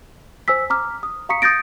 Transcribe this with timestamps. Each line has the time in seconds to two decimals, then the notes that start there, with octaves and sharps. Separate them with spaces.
0.48 C5 G#5 E6 B6
0.70 A#5 D6 F6
1.03 D#6
1.29 F5 A#5 C#6 D#6 B6 C#7
1.42 D#6 G6 A6 A#6 D7